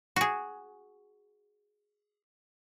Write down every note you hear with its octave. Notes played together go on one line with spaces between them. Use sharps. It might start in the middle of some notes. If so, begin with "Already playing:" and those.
F#4 G#4